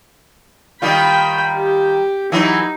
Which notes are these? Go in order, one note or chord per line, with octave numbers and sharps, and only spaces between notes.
D#3 G3 F4 G5 B5
G4
E3 F#3 D#4